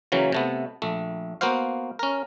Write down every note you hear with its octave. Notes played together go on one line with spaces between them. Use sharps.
C#3 E3 F#3 A#3 C#4
C3 A3 B3
A#1 A3
A#3 B3 F#4 C5 F5
C#4 A#4